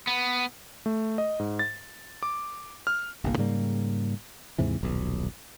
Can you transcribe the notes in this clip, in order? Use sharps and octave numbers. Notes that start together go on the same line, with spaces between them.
B3
A3
D#5
G#2
A6
D6
F6
G1 C2 A#3
G#2 C#3 G3 A#3
D#2 G#2 C3 E3
D#1 B1